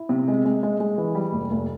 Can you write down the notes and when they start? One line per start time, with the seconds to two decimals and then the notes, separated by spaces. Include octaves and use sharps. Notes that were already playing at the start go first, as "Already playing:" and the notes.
Already playing: E4
0.09 C3
0.28 G#3
0.45 G#3
0.63 G#3
0.80 G#3
0.98 E3
1.15 G3
1.32 F1
1.51 F1